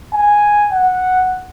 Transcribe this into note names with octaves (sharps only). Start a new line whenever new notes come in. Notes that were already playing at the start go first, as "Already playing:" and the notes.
G#5
F#5